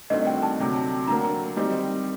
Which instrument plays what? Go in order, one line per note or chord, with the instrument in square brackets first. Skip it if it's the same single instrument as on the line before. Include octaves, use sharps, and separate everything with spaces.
[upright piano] G2 D#3 A3 C4 F#4 [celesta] D#5
[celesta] G5
A5
[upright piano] D2 C3 F#3
[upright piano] D3 F#3 A#3 [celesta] A#5
[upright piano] D#3 G3 C4 D#4 G4